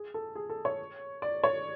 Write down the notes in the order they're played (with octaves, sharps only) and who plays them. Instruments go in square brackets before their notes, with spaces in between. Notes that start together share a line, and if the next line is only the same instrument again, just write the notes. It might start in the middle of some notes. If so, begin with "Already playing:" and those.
Already playing: [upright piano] G#4
A4
G#4
A4
C#5
D5
C#5